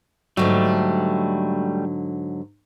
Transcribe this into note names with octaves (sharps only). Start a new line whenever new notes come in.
G#2 D3 F#3 G3 A3